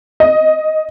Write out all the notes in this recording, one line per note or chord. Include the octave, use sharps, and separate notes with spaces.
D#5